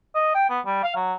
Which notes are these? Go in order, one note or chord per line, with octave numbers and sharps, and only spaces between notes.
D#5
G5
B3
G3
F5
F#3